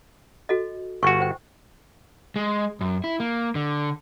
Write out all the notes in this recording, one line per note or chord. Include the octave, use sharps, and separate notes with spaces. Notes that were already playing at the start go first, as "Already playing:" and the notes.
F#4 A4 D#5
G1 F#4 G#5 C#6
C5 G5
G#3
F#2
E4
A#3
D3